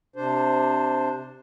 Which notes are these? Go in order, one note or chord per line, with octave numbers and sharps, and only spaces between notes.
C3 D4 C5